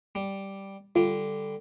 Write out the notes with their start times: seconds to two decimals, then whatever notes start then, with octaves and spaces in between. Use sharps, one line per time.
0.15 G3
0.96 D3 G3 F4